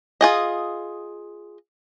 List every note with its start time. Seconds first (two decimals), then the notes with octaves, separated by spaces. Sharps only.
0.21 F4 G#4 D#5